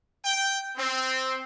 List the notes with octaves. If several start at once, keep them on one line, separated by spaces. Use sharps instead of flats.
G5
C4